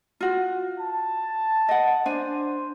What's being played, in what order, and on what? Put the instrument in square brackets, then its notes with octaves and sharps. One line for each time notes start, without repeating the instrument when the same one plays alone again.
[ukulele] F4 F#4
[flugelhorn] A5
[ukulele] D#5 F#5
[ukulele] D4 G#5 [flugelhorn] C5